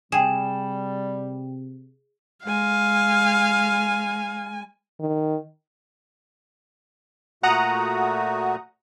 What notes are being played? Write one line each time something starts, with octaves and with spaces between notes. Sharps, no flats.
C3 G3 G#4 G5 E7
G#3 F5 G#5
D#3
A#2 A3 F#4 F#5 A#5 D#6